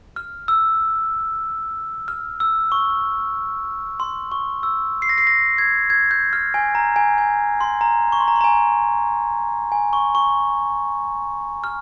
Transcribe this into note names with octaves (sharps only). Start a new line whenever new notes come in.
F6
E6
F6
E6
C#6
C6
C#6
E6
C7
A#6
C7
A#6
G#6
G#6
G6
F6
G#5
A#5
G#5
G#5
C6
A#5
C#6
C6
A#5
C6
A#5
G#5
G#5
C#6
C#6
F6